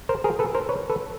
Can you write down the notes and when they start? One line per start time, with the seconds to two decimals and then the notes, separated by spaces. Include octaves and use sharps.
0.09 A#4 C5
0.24 G#4 A#4
0.39 A4 B4
0.55 A#4 C5
0.69 B4 C#5
0.90 A4 B4